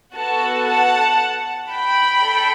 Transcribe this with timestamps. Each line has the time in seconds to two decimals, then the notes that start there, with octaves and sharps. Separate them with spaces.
0.15 B3 F#4 A4 F#5 A5
0.67 F#5 A5
1.71 G5 B5
2.23 A4